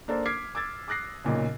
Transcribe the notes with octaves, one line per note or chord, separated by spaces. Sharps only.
A#3 D4 A4 A#4 C5
D6 F6 G#6 B6 C7
D6 E6 G#6 A6
D6 D#6 F#6 A#6 C7
B1 A#2 C#3